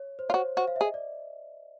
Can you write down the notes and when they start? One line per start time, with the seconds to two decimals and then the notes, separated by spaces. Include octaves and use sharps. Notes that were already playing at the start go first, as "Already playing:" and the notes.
Already playing: C#5
0.19 C5
0.29 F4 C#5
0.34 F#4 C5
0.57 F#4 C5
0.67 F5
0.76 E5
0.81 G#4
0.85 D#5
0.94 D5